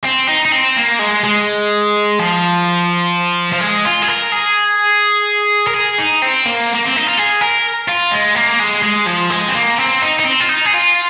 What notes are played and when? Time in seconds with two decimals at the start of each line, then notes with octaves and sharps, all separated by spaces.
0.04 C4
0.28 D#4
0.45 D#4
0.52 C4
0.76 A#3
0.99 G#3
1.24 G#3
2.19 F3
3.53 F3
3.61 G#3
3.85 F4
4.02 G#4
4.08 A#4
4.32 G#4
5.67 A#4
5.74 G#4
5.98 D#4
6.22 C4
6.46 A#3
6.74 A#3
6.85 C4
6.96 D#4
7.07 F4
7.17 G#4
7.41 A#4
7.89 F4
8.12 G#3
8.36 A#3
8.60 G#3
8.83 G#3
9.07 F3
9.30 G#3
9.49 C4
9.55 A#3
9.78 C4
10.02 D#4
10.20 D#4
10.25 C4
10.40 F4
10.49 D#4
10.65 G#4
10.74 F4